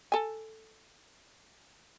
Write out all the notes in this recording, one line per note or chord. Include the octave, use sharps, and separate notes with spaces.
A4 G#5